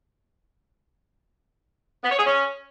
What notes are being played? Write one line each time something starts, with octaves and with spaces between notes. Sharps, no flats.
B3
C#5
G#4
C#4